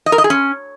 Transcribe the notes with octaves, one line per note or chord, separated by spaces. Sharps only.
D#5
A#4
D#5
G#4
C#4